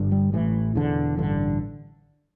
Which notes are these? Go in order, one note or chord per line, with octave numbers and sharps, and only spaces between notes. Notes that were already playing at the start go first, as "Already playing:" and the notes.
Already playing: G1 G2 D3
G3
A1 A2 E3
E1 E2 D3
A1 G2 D3